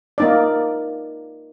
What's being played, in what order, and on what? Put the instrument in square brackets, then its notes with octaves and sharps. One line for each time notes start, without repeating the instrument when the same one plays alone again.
[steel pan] A#3 D#4 D5